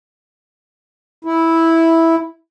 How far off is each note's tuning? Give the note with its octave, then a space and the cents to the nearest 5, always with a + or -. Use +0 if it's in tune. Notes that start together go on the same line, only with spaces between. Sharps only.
E4 -5